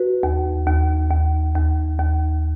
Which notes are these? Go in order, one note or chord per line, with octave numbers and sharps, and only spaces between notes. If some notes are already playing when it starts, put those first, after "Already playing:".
Already playing: F#4 B4
D#2
D#2
D#2
D#2
D#2